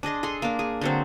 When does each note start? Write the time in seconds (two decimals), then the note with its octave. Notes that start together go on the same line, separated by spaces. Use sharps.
0.03 D4 G#4 D#5 C6
0.23 G#4 A4 C6
0.42 A#3 D4
0.59 G#4
0.81 D3 F#3 C4